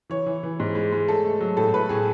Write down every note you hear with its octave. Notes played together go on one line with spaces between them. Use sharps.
E3 C#5
E3
E3
G#2
G#3
G#3
A3 A4
A3
F#3
A2 A4
A2 B4
A2 G#4